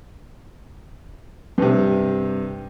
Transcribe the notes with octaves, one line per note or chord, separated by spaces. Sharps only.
G2 C3